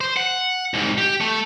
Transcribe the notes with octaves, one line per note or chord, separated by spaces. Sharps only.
C5
F#5
C2 G#2
G4
A3